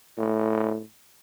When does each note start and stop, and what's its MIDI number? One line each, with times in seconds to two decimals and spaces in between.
0.18 0.82 45